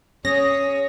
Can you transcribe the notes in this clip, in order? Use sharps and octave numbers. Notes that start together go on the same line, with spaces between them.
C#4 G#4 C#5 D#6 A#6